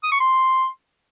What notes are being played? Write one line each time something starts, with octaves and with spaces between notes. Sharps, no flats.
D#6
C#6
C6